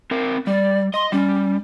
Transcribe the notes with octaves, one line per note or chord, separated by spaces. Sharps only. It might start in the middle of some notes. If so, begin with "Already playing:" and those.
C4 A#4
G3 D5
D#5 C6
G3 C#4